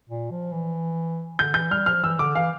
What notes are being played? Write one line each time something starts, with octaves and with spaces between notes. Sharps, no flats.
A#2
F3
E3
D3 G6
E3 G6
G3 F6
F3 F6
E3 E6
D3 D6
E3 F5